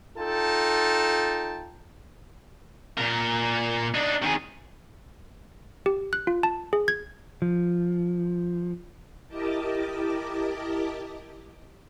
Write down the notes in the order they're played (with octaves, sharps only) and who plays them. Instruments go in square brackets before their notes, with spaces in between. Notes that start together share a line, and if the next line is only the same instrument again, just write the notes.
[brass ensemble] D#4 F4 A4 G5 A5
[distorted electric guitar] A#2 A#4
D4 D#4
D#3 G#4
[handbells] G4
F#6
F4
A5
G#4
G#6
[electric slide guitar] F3
[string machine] E4 G4 A#4 D#5 A5 D6